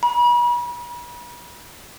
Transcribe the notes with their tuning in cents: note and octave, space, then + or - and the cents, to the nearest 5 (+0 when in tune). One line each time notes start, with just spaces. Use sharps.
B5 -40